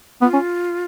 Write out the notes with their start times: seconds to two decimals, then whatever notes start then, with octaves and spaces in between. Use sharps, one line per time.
0.22 B3 F4
0.33 C#4